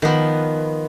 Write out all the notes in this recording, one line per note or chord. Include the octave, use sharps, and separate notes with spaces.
D#3 F3 B3